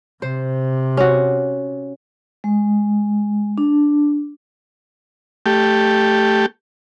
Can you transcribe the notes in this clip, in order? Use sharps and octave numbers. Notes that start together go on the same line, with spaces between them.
C3 C5
C#4 F#4
G#3
D4
A3 G4